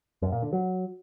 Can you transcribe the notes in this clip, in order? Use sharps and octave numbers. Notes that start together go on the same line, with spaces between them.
F#2
A#2
D3
F#3